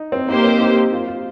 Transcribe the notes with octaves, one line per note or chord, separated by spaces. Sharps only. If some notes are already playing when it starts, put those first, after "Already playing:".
Already playing: D#4
C4
A#3 D#4 G4 C5
C4
D#4
F4
F4